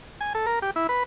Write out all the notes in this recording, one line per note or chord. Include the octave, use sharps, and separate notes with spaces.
G#5
A4
A#4
G4
E4
B4